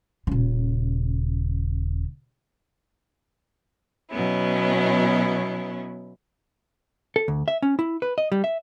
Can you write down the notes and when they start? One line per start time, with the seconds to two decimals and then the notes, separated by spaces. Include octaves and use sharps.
0.27 D#1 C#3
4.11 B2 F#3 B3 C#4 E4
7.16 A4
7.28 D2
7.48 E5
7.62 C#4
7.79 E4
8.02 B4
8.18 D#5
8.32 G3
8.44 E5